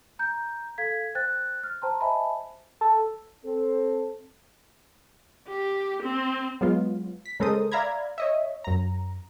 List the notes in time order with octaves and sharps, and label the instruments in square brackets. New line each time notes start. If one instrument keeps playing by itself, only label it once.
[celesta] A#5 G6
A4 F5 G#6 B6
C5 G5 F#6 A6
F6
C5 G5 A5 A#5 C6
C5 D#5 E5 G#5 A5 B5
[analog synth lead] A4
[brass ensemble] C4 A4
[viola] G4
C4
[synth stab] F#3 G#3 B3 F4
B6
C#3 G#3 A4 A#4 C5 D#6
D5 E5 F5 A#5 B5 G#6
C#5 D#5 E5
F#2 A#5